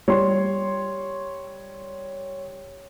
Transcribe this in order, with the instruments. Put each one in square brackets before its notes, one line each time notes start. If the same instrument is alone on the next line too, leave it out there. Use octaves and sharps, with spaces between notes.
[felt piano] G3 [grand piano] C#5 C6